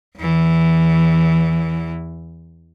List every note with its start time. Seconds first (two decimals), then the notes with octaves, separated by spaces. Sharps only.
0.18 E2 E3